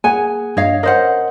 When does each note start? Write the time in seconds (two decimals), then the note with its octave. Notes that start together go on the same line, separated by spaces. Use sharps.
0.04 A#3 G#4 F#5 G#5
0.57 G2 C#5 D#5 F5
0.83 C#4 A#4 C5 D#5 F#5